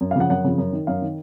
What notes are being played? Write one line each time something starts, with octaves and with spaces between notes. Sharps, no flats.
F#2
F5
C#3 F3 F#5
F#2 F#5
C#3 F3
F#2
D#3
F#2 F5
D#3